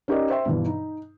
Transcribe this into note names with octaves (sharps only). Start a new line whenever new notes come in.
C#4 D#4 G4 A#4 D5 D#5
C5 E5 G5 C6
G2 B2 E3
D#4